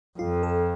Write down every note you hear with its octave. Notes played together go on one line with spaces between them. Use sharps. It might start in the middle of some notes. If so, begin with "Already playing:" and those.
F2 F4
A4